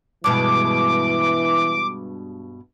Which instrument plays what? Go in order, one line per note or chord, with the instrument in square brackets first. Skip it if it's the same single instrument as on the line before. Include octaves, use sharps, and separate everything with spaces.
[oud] G2 B2 G#3 [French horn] E3 [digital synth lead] D6